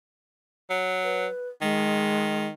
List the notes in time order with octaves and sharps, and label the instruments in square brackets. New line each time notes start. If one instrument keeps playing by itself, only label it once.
[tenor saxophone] F#3
[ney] B4
[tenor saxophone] D#3 [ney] G#3